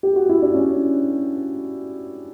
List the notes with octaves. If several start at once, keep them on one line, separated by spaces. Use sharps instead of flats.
G4
F#4
E4
D4
C#4